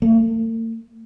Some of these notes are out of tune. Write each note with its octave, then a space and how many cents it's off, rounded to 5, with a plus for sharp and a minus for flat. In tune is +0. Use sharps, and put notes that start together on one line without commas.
A3 +45